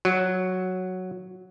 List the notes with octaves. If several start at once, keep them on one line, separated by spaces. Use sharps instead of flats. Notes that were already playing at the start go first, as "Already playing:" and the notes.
F#3